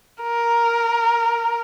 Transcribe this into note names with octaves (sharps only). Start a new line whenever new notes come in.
A#4